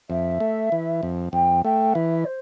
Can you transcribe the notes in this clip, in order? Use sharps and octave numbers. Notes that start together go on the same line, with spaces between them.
F2 E5
A3
E3
F2
F2 G5
A3 G5
E3 E5
C5